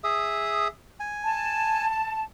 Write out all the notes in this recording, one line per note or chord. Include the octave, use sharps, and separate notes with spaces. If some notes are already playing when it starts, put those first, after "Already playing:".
G#4 E5 D#6
G#5
A5